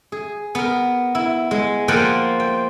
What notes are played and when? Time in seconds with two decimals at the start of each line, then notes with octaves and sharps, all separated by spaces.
0.12 G#4
0.55 B3 A#4
1.15 E4
1.51 G#3
1.88 F3 A#3 F4 F#5 G5 C6
2.40 G5